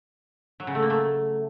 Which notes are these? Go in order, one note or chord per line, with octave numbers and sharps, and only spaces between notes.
F#3
C#3
A3
A#3
A3